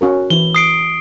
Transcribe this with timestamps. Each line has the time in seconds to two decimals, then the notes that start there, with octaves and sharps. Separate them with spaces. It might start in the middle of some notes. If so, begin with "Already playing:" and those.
0.01 C#4 F#4 A#4
0.30 E3 E4 G7
0.55 D#6 C7 D7